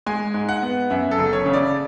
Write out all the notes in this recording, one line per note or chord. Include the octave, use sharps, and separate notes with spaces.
G#3 G#5
G#2
F#5
B3
F#2 E5
A4
F#1
C#5
C#3
D5